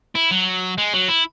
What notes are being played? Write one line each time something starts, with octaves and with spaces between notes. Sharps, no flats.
E4
F#3
G#3
F#3
E4